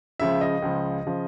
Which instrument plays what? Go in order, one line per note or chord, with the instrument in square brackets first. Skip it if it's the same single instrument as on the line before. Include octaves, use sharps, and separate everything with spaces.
[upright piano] C#2 C#3 F3 E5
D#5
C#2 C#3 F3
C#3 F3